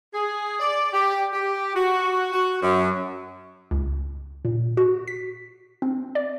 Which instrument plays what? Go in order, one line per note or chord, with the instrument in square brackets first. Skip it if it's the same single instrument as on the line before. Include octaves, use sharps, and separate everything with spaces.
[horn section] G#4
D5
G4
G4
F#4
F#4
F#2
[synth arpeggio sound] C#2
A#2
F#4
B6
C4
D5